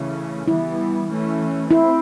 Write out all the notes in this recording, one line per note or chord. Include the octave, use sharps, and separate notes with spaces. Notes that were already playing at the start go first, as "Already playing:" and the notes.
Already playing: C#3 E3 A3 C#4
E3 G3 B3 E4
E3 A3 C#4
C4 E4